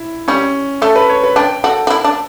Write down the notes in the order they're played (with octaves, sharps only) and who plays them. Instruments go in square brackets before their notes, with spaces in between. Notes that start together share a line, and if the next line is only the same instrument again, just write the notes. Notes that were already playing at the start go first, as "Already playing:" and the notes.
Already playing: [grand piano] E4
[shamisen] G3 [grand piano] C#4
[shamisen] A3 [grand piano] A4
[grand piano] B4
C#5
B4
[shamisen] D4 [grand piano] G5
[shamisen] F#4 [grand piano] A4
[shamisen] F#4
E4
D4